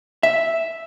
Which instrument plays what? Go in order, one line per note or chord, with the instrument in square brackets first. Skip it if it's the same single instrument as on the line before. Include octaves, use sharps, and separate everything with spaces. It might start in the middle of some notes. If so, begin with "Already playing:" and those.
[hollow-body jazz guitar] E5